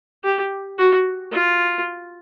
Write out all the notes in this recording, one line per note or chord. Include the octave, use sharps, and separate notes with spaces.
G4
F#4
F4